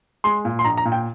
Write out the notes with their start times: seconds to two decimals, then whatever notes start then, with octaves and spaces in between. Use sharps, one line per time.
0.24 G#3 C6
0.45 A#2
0.59 C6
0.64 A#1 A#5
0.78 A#5
0.85 A#2
0.92 G5